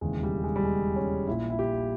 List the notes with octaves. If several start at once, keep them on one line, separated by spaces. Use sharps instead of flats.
E1 D#2 C#3 E3 G#3
G3
G#3
G3
G#3
C#4
A#1 A#2 E4
E4
G4